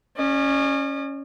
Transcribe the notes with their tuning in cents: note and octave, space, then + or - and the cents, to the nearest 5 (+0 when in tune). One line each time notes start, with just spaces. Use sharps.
C#4 +0 D5 +45